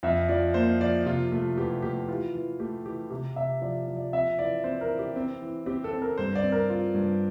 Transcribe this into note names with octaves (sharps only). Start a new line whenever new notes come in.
F2 E5
F3 D5
A#3 C5
F3 D5
C3 F4
A3 F4
E2 G4
A3 G4
E3 F4
E3
A3 G4
E3 G4
C3 G4
C3 E5
F3 D5
F3
D5
C4 E5
E3 D5
C4 C5
A#4
E3
G4
C4
E3
C4 G4
A4
C4
A#4
G2 C5
D5
C4
A#4
F4
G2